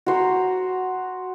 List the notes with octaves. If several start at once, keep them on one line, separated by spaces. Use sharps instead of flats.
F#4 C5 A#5